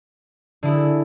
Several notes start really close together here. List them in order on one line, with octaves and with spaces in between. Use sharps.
D3 E4 G#4